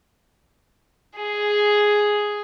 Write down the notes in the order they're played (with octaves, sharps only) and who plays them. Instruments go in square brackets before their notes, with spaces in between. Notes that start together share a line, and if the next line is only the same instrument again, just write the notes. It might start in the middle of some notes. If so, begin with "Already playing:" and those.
[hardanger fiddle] G#4